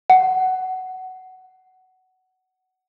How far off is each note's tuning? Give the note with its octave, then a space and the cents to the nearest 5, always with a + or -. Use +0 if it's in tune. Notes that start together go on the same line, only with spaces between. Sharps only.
F#5 +15